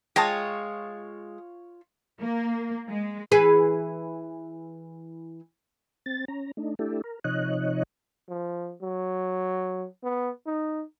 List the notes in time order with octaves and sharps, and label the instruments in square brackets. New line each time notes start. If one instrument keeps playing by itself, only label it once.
[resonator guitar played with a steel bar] G#3 [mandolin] F4 C#5 [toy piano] G5 D#6 [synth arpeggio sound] A5 A#6
[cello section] A#3
G#3
[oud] E3 G#4 B4
[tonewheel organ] C4 A6
C#4 A#5
A3 D4 D#4
A3 D4 E4 G4 A4
A#4
C3 F3 D#4 C#5 D#5 F#6
[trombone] F3
F#3
B3
D#4